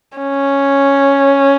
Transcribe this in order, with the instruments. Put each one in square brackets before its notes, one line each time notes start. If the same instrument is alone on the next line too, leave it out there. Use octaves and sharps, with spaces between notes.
[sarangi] C#4